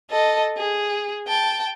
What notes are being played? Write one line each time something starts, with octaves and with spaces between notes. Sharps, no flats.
A4 D#5
G#4
G5 A5